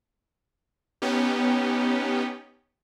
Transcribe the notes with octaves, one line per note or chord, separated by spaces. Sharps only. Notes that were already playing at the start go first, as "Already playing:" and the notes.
B3 C#4 D#4 G4